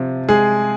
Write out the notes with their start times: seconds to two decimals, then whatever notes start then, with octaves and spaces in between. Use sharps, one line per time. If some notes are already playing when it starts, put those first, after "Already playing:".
Already playing: C3 F3
0.29 G#3 G#4